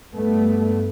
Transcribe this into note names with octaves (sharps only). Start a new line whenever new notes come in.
G2 A3 B3